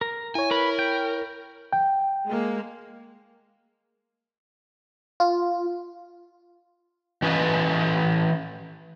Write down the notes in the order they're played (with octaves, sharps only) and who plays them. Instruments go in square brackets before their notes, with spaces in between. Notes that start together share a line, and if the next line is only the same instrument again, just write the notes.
[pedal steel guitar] A#4
[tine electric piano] E4 C#5 [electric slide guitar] G#5
[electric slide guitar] A#4 [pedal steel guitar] B4 B5
[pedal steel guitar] G5
[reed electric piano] G5
[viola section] G#3 A#3
[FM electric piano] F4
[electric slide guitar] E3 C#4 B4 D#5